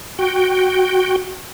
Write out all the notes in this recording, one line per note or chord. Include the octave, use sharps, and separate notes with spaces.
F#4 G5